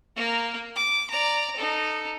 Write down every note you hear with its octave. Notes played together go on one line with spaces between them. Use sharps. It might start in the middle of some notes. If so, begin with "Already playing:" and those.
A#3 A#4
D6
D5 A#5
D#4 A4